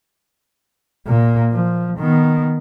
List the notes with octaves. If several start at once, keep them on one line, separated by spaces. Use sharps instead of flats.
A#2 A#3
F3
D#3 B3